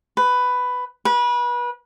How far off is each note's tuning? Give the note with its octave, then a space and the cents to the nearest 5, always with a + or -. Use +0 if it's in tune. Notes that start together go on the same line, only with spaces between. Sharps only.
B4 +10
B4 -30